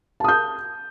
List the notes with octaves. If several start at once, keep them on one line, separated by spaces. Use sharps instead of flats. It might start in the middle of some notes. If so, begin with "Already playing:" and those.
A5 D#6 G6